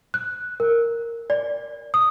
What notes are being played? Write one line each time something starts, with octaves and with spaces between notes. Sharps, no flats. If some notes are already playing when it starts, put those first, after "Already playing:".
F#6
A#4
D5
D#6